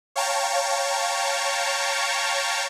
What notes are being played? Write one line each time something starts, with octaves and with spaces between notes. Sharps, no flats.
C#5 F5 G5 A5 A#5 C#6